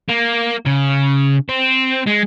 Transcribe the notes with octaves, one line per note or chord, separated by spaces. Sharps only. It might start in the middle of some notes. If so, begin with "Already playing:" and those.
A#3
C#3
C4
G#3